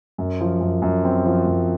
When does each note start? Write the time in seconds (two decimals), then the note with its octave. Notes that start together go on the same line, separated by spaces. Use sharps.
0.18 F#2
0.41 F3
0.61 F#2
0.82 F#2
1.04 C4
1.26 F3
1.46 F#2